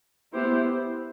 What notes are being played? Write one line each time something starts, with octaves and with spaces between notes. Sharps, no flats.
B3 E4 G4 C5